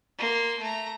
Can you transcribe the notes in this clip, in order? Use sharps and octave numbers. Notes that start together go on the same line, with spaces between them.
A#3 C6
A3 A#5